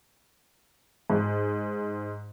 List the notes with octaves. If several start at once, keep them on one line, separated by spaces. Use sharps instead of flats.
G#2